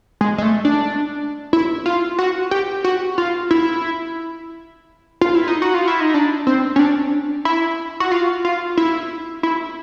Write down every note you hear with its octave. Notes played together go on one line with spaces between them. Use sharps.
G#3
G#3
A3
D4
E4
F4
F#4
G4
F#4
F4
E4
F4
E4
D#4
F#4
F4
E4
D#4
D4
C4
C#4
D4
E4
F#4
F4
F4
E4
E4